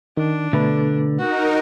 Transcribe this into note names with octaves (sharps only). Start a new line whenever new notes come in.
D#3 D4
B2 D3 A3 B4
D#4 F#4 A#4